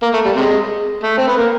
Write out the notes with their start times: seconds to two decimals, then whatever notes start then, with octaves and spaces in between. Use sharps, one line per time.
0.02 A#3
0.14 A3
0.25 G3
0.36 C3 G#3
1.03 A3
1.17 C4
1.28 B3
1.37 A#3